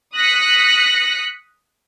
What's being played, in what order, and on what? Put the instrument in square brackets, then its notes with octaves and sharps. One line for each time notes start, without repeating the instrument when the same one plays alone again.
[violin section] D#6 F#6 A#6 B6 C#7